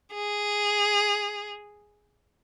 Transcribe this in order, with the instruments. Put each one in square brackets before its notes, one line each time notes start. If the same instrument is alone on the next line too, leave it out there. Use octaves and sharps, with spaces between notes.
[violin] G#4